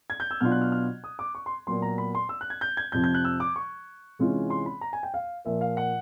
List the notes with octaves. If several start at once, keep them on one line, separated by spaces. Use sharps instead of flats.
G#6
G6
E6
B2 F#3 B3 D4 F4 F6
F#6
F6
F6
D#6
D6
C#6
C6
A#2 F#3 B3 C6
A#5
B5
C6
E6
F#6
G#6
G6
G#6
F2 C3 F3 G6
G6
F#6
E6
D6
C#6
C3 E3 G#3 C#4 F4
C6
B5
A#5
G#5
G5
F5
A#2 F3 A#3 E5
F5
F#5